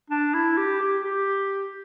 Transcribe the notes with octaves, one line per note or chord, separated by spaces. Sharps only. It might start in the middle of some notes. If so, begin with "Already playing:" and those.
D4
E4
G4
G4
G4